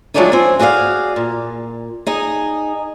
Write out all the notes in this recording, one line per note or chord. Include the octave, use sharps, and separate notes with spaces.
F3 F#3 G#3 A3 D4 D#4
C4 G#5
F#4 G#4 D5 D#5 F5
A#2
D#4 G#4 D#5